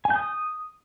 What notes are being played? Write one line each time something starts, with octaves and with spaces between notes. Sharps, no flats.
G#5
G6
D#6